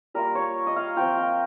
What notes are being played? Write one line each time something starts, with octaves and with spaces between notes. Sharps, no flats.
G3 A#3 F4 A#4
C#5
D#5
F5
F3 C4 F4 G5
G5